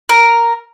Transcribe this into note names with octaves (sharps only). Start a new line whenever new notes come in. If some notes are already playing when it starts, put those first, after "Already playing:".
A#4